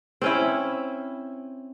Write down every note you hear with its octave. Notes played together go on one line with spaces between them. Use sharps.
C4 C#4 E4